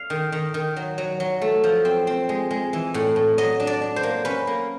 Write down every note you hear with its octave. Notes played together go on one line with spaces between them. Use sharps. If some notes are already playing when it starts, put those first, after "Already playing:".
Already playing: F5
D#3
D#3
D#3
F#3
F#3
F#3
A3
F3
C4
C4
G#3
G#3
E3
A2
A2
F#3 D#5
D4
D5
D4
C5
A#3
C#4 B4
A#3